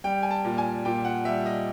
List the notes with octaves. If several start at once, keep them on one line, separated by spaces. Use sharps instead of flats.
G3 G5
G#5
A5
A#2
G#5
A#2 G5
F#5
G3 E5
D#5